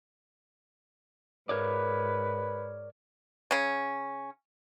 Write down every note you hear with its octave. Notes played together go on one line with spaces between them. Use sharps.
G#2 A#4 B4 C#5 D5
C#3 C#4